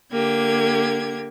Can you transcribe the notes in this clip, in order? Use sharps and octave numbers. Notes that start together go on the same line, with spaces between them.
D3 A#3 G4 G#6